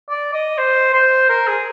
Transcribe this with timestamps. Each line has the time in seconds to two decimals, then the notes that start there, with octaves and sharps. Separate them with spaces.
0.10 D5
0.33 D#5
0.58 C5
0.93 C5
1.29 A#4
1.48 G#4